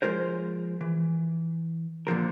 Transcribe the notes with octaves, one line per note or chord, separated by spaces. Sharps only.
F3 G3 G#3 F4 A#4 C5
E3
A#2 D3 F3 A#4